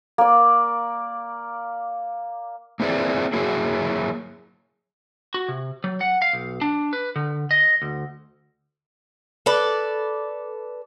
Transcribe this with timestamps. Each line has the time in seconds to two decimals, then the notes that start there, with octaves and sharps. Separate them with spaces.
0.18 A#3 D5
2.80 A#3 C4 E4 G#4 D5
3.33 F#3 A#3 E4 F#4 G#4
5.34 F#4
5.49 C3
5.84 F#3
6.01 F#5
6.22 F5
6.33 B1
6.61 D4
6.93 B4
7.16 D3
7.51 D#5
7.82 D2
9.46 A4 B4 D5